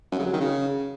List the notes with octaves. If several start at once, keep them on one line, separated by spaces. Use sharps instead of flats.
F#2
C#3
F#3
D#3
C#3